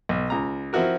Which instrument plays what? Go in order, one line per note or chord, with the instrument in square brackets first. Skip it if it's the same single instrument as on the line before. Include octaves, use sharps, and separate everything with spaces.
[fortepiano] B1
C#2 A#5
F3 C4 E4 F#4 A#4